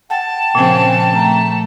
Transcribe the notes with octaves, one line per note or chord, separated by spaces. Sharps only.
F#5 G5 A5
A#2 C#3 F3 C4 C#4 G#5
A3 A#5